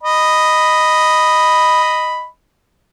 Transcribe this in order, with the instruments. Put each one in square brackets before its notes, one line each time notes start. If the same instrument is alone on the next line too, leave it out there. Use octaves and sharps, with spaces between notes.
[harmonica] D#5 B5